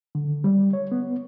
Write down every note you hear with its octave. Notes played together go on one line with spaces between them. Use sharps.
D3
G3
C#5
B3